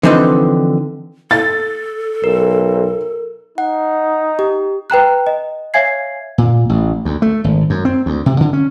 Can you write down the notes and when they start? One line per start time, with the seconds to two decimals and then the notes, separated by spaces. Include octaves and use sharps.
0.03 D3 E3 F3 C4 D#4 B4
1.31 A4 A6
2.24 B1 A#4
3.58 D#4 F#5
4.39 G4
4.90 B4 G5 A#5 F#6
5.27 D#5
5.74 C#5 E5 F5 G#5 G#6 C7
6.38 A#2
6.69 A1
7.05 D2
7.22 A3
7.44 G#1
7.70 F#2
7.85 C4
8.06 D2
8.26 C3
8.41 D3
8.53 C#4